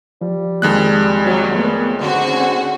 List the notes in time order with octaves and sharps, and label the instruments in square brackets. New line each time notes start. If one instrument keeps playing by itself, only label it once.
[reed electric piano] F3 [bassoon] G3
[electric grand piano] F2 G#3 F#6 [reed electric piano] D#3 A#3
[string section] F#3
[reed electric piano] A3 A#4 C#5 [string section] B3
[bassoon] G#2 [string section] D3 C4 F#4 [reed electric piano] D#5
[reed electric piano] C#4 G#5